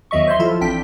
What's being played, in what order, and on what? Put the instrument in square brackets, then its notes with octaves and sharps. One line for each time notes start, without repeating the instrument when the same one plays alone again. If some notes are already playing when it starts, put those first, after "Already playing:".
[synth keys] E2 D#3 F#3 D#5 E5 C#6
C5 C#5 E5 C6
F3 E4 F4 A4
A1 C4 D4 G5 B6